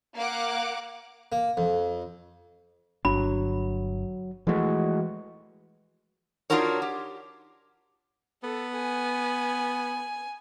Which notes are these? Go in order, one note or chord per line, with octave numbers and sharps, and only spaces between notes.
A#3 F5 F#5 D6
A#3
F2
G1 F#3 D4 B5
E3 F3 G#3 A3 F#4
D4 D#4 F4 F#4 A#4 C#5
G4
B3 A4
G#5